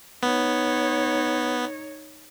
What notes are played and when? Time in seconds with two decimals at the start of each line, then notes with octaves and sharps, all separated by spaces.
0.23 B3 D#4 C#5